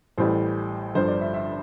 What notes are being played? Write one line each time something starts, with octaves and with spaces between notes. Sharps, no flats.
A1 A2 E3 G3 C5
G1 G2 D3 F3 C5
D5
E5
E5